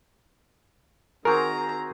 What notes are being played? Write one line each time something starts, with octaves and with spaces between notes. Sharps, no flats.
D#3 C4 F#4 G#4 A#4 A#5